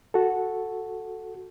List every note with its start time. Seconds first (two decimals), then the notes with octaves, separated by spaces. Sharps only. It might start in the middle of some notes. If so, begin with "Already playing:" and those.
0.14 F#4 A4